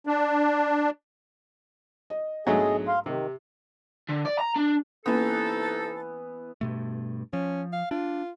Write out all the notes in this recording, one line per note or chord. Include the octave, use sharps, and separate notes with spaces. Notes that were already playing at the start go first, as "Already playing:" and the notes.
D4
D#5
B1 G#2 F#3 G#3 A3 D4 G#4 D#5
F5 C6
C3 D#3 G4
D3
D5
A#5
D4
C3 E3 A#3 B3 C#4 D#4 A4
G2 B2 A3
F3 C#4
F5
D4 F4